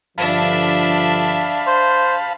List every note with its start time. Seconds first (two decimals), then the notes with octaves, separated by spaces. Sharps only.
0.18 G2 D3 F3 D4 E5 F5 A5 B5
1.67 C5